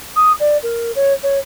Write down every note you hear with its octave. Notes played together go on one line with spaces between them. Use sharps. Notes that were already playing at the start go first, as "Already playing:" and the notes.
D#6
D5
A#4
C#5
C#5